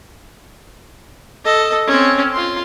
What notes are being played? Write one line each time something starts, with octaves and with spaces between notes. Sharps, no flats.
A4 D#5
C4 C#4
F4 C6